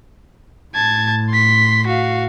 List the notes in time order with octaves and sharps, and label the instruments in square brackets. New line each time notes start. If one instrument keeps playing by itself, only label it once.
[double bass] A2 [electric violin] A5 G#6
[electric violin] C6 B6
F#4 F5